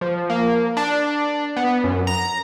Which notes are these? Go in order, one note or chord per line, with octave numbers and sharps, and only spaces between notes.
F3
A#3
D4
B3
F#2
A#5